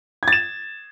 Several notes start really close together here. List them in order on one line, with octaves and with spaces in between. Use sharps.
G#6 A6 E7